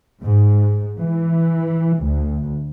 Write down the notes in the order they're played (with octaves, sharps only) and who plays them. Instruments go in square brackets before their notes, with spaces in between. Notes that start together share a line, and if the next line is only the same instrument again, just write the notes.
[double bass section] G#2
E3
D2